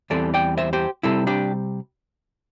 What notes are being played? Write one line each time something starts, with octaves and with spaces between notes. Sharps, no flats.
E2 E3 G3 C4 A4 D5
D5 G5
C5 E5
G4 C5
C3 G3 C4 E4 A4
D4 G4